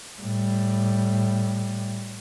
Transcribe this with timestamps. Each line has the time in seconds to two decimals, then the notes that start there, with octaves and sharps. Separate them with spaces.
0.21 A2 G3